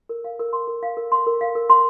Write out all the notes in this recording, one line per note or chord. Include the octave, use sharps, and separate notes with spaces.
A#4
F5
A#4
C6
A#4
F5
A#4
C6
A#4
F5
A#4
C6